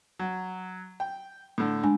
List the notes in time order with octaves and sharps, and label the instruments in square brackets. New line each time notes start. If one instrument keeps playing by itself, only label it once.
[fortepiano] F#3
G5
A2 D3
[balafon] G#3 D4 G#5